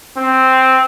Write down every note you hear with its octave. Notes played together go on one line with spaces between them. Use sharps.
C4